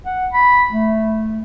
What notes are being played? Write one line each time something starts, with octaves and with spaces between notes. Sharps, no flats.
F#5
B5
A3